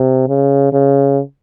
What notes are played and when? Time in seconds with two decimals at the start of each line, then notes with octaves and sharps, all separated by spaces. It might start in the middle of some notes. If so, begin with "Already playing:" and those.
Already playing: C3
0.28 C#3
0.73 C#3